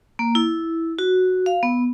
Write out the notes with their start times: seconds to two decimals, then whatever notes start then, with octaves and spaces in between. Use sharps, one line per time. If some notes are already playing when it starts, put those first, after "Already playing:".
0.19 A#3
0.35 E4
0.99 F#4
1.46 F5
1.63 B3